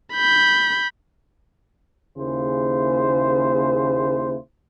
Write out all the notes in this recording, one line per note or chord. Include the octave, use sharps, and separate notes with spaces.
B5 G6
D#2 C#3 A#3 E4 G#4 C5